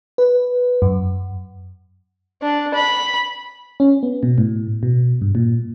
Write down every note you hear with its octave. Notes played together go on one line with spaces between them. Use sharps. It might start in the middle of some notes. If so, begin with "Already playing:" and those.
B4
F#2
D4
B5
C#4
B3
B2
A2
B2
G2
A#2